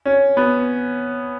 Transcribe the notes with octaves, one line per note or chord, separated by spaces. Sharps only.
C#4
B3